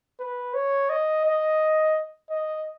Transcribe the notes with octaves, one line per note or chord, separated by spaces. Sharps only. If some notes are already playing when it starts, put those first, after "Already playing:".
B4
C#5
D#5
D#5
D#5